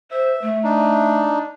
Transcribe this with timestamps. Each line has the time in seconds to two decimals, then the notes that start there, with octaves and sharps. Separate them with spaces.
0.11 C5 E5
0.42 A3
0.64 D4 D#4